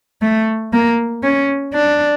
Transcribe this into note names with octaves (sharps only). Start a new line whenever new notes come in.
A3
A#3
C#4
D4